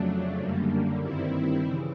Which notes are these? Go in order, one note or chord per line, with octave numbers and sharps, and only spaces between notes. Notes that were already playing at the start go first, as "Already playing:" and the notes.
Already playing: F2 C#3 F#3 A3 D4
F#2 D3 G3 A#3
G2 D#3 G3 C4 E4
C#3 E3